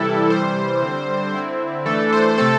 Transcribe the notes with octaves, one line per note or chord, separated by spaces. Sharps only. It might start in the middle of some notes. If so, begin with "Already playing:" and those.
Already playing: C3 E3 G3 E4 A4
C3 E3 G3 C5
D3 G3 C4
D3 C4 E4
E3 A3 D4 A4
C5
C3 A3 C4 A4